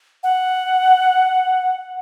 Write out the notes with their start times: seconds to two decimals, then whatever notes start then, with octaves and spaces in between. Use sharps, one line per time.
0.23 F#5